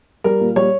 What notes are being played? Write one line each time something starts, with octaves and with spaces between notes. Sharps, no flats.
G3 A#4
A#2
G3 C#5